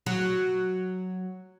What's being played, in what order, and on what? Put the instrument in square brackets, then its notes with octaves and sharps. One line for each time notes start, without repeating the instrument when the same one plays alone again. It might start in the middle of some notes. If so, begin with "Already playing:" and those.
[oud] F#3